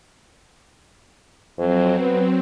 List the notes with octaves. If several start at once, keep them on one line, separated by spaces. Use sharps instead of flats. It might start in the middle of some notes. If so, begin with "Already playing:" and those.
F2 F#3 C4
B3